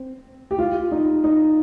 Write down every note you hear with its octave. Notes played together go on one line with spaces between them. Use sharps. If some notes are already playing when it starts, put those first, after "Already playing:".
Already playing: C4
G4
F4
D#4
D#4